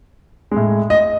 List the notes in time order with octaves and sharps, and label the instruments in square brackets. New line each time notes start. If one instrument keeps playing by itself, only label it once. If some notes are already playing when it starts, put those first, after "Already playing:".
[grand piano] A2 G#3
D#5